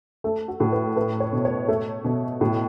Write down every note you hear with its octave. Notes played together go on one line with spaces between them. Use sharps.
A3 A4
F#4
A2
B4
A3 B4
C#5
B2
C#5
A3
B2
A2